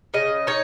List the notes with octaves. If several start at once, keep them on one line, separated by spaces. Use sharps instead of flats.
C#3 D#5
D#4 C#5